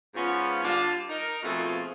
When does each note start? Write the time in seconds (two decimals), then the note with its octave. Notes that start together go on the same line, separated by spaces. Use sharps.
0.15 G#2 B3 C#4 F4
0.63 D3 G3 D4 F4 F5 A5
1.09 D#4 A#4
1.43 B2 F3 A3 C4 F4 G#4